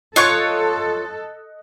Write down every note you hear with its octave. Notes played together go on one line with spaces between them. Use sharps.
F4 A4 C#5 D#5 C#6 F#6 C#7